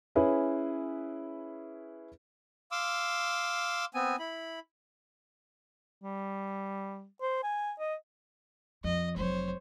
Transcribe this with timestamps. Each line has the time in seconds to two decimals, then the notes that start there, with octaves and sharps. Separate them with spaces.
0.15 C#4 E4 G#4 B4
2.71 F5 C6 D6 E6
3.94 B3 C4 G#5
4.19 E4 B5
6.03 G3
7.21 C5
7.43 G#5
7.79 D#5
8.84 F2 D#5
9.16 F1 F#3 C5 C#5